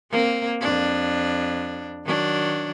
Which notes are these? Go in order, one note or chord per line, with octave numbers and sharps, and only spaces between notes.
A#3 C4
F2 D4
D#3 F#3 D4